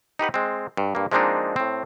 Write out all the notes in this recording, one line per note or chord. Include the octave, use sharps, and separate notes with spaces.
D#4 G4 B4 F#5
G#3 C4
G2
G2 A#3
F3 G#3 A#3 C4 D4 D#4
A2 C4